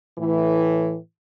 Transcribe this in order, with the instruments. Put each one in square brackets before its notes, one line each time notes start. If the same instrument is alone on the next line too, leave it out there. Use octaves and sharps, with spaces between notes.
[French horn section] A2 E3